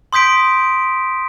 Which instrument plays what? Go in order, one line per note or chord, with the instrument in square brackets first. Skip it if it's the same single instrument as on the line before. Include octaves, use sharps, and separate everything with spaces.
[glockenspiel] C6 D#6 G6 B6 D7